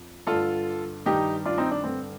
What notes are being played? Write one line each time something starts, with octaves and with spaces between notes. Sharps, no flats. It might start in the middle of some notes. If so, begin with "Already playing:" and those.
Already playing: F2
G2 D3 F4 A4
G2 D#3 D#4 G4
D4 F4
C4 D#4
D4
G2 D3 C4